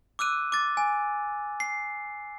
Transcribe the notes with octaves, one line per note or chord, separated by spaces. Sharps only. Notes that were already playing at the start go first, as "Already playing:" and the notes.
D6 E6 F#6 D#7
D6 A6
G#5
C7